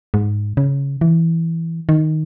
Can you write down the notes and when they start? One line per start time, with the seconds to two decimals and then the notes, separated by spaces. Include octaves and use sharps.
0.14 G#2
0.57 C#3
1.01 E3
1.89 D#3